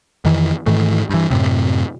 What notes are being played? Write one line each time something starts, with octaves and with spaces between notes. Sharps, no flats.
F2 D#3 E3
G#2 D#3 E3 A3
G2 E3
F#2 A2 C3